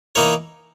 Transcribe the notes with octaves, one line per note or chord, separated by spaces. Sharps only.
E3 A#3 D#4 A#4 C#5